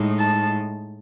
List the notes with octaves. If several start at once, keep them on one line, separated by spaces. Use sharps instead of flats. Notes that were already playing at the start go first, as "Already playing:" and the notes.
Already playing: A2 G#3 D#4
A5